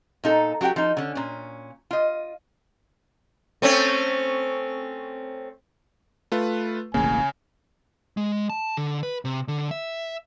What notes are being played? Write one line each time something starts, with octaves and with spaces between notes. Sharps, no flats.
A#2 D#4 A4
F#3 F#4 G4 F#5 G5
F3 D#4
D3 C#4
A#2 C#4
F4 D#5
A3 C4 C#4
A3 F4 B4
E1 A1 C#3 A#3 G#5
G#3
A5
D3
B4
C3
D3
E5